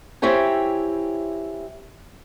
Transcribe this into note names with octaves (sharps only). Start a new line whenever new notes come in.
C4 E4 G4 C#5 G#5